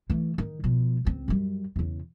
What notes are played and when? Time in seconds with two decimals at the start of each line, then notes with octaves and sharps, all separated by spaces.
0.10 E3 A3
0.38 D#3
0.64 B2 F3
1.05 C#2 C4
1.28 F#2 G3
1.76 E2 C#3